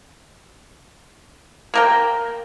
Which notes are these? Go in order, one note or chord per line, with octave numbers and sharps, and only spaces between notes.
A#3 A#4 G5